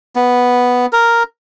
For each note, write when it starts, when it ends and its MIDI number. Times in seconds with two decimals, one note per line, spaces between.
0.16 0.86 59
0.93 1.23 70